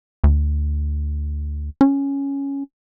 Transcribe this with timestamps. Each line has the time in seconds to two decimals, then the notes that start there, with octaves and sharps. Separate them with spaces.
0.24 D2
1.81 C#4